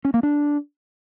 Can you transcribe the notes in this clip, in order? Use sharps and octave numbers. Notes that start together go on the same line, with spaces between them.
C#4
A#3
D4